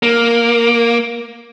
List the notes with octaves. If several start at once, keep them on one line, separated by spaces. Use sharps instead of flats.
A#3